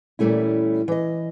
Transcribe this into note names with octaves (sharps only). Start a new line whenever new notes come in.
A#2 E3 G3 A3 C#4 E4
E3 D#5